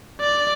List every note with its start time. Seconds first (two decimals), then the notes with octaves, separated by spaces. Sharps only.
0.20 D5